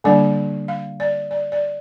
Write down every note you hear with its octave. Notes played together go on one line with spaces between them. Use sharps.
D3 G3 A#3 D4 D5
F5
D5
D5
D5